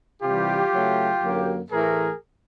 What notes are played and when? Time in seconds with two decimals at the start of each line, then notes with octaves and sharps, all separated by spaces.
0.22 C3 E3 G3 F4 G4
0.72 C#3 F#3 A3
1.22 F#2 D3 F#3 A#3
1.70 A2 E3 A3 G#4 A#4